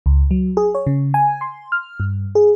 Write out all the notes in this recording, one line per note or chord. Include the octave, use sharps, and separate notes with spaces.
C#2
F#3
G#4
C#5
C#3
G#5
C6
F6
G2
G#4